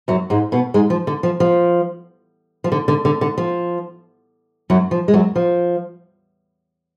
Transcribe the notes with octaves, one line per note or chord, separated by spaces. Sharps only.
F#2 F#3
G#2 G#3
B2 B3
G#2 G#3
F3
D3
F3
F3
F3
D3
D3
D3
D3
F3
F#2 F#3
F3
G#3
F#2 F#3
F3